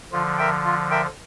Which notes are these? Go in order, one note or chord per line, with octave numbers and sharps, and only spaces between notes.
D3 F3 F4
A#4 E5 G5
F4
A#4 E5 G5